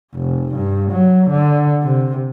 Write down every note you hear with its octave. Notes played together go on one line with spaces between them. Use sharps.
F1
G2
F#3
D3
C3